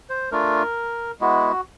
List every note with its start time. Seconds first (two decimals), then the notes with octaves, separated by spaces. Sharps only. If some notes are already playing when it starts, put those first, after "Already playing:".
0.10 C5
0.31 A3 D4 F4 A#4
1.21 G#3 B3 E4 F#4